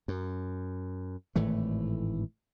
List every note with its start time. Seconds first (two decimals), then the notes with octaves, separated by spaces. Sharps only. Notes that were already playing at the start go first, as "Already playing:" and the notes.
0.08 F#2
1.36 G#1 A2 E3 A3